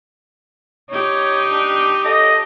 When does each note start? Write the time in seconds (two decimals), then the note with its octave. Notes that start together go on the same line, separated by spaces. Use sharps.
0.90 D#4 G4 C#5
1.51 D4
2.05 A4 D#5